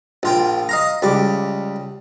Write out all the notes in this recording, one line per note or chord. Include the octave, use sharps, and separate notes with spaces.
A#1 F4 G5
D#5 F5 A#5
C#2 G3 D6